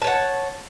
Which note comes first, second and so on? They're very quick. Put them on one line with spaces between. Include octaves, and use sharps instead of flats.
A5 C#5 F#5